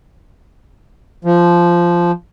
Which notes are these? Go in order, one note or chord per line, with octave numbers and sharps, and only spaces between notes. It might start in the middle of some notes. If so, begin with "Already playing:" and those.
F3